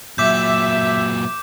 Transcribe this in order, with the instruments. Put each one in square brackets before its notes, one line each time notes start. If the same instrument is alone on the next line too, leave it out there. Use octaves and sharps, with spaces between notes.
[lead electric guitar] A#2 F#3 [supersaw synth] E5 [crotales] D6 G6